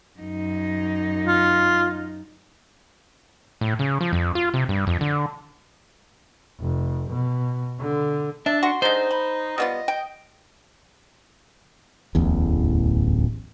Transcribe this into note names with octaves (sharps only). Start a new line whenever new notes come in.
F#2 D#4
F4
A2
C#3
F3
F2
F4
C3
G2
F2
D3
F1
B2
D3
D4 E5 A5
F#4 C6
D3 G#3 D#4 C5
B5
G3 B3 F4 D#5
G5
D1 A1 E2